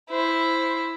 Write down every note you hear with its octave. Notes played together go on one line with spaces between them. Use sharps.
E4 C5